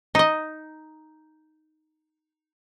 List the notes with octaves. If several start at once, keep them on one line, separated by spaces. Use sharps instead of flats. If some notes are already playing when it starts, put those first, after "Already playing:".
D#4 D#5